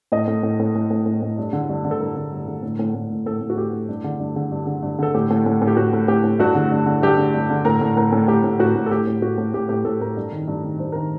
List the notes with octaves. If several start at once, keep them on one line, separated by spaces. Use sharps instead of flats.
A2 D#5
A2
A2
A2
A2
A2
A2
A2
G2
D3
G2
D3
A4
G2 A#4
D3
G2
D3
A2
A2
A2
A2
A2 A4
A2
F#4
A2 G4
A2
G2
D3
G2
D3
G2
D3
G2
D3 A4
A2 G4
A2
A2
A2
G4
A2 F#4
A2
A2 G4
A2
G2 F#4
D3
G2
D3
G2 G4
D3
G2
D3
A2 A#4
A2
A2 A#4
A2
A2 G4
A2
A2 F#4
A2
A4
A2 G4
A2
A2 F#4
A2
A2 G4
A2 G4
A2 A4
A2 A#4
G2
D#3
G2
D#3
G2 C5
D#3 A#4